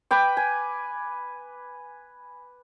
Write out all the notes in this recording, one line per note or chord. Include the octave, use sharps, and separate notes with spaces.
B4 G5 D6
G#5